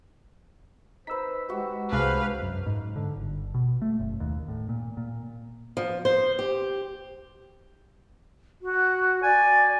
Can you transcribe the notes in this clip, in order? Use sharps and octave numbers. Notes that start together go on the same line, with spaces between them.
D#4 B4 C5 E6 B6
G#3 F#4 G4
C2 G#3 D4 G#4 B4 C5 F5
F#2
G#2
D3
G1
B2
A3
F#1
D#2
A2
A#2
A#2
F3
C5
G4
F#4
D5 G#5